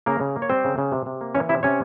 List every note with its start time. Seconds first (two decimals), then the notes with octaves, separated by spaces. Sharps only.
0.06 C#3 A#3 A#4
0.21 C#3
0.36 A#3
0.42 C#5
0.49 G3 C4 C5
0.64 C#3
0.78 C#3
0.92 C3
1.06 C3
1.21 A#3
1.35 E3 C#4 C#5
1.49 C3 E4 E5
1.63 C3 C#4 C#5